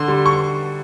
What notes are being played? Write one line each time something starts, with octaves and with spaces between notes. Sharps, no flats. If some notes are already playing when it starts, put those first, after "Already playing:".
Already playing: D3 C6
G3
C#6